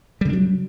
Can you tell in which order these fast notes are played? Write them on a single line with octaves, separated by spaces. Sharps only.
G3 C#3 D4 F#3